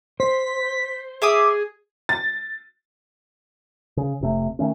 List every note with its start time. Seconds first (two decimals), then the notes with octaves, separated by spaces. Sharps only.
0.20 C5 B6
1.22 G#4 E5 D6 D#6
2.09 A6
3.97 C#3
4.21 F1 C3 A3
4.59 D#3 A3 C#4